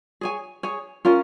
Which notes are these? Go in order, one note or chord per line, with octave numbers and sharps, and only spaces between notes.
G#4 C#5 G#5
G#4 C#5 G#5
C#4 F4 A#4